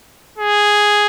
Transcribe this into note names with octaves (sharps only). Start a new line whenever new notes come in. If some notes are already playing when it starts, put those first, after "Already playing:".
G#4